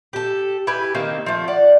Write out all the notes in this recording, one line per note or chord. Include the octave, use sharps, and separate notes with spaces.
G4 A4
E4 G4 B4 G#5
D#3 A#3 C4 D#4
F3 A3
D5 F#5